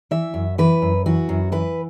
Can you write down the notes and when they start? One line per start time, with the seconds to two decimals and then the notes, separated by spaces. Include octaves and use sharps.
0.11 E3 E5
0.34 F#2
0.58 E3 B4
0.82 F#2
1.06 E3 F#4
1.29 F#2
1.52 E3 B4